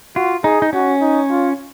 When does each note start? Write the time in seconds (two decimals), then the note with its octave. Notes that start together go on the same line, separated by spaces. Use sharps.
0.16 F4 F#4
0.44 D#4 G#4
0.62 D#4
0.73 C#4 F#4
1.01 D#4
1.30 F4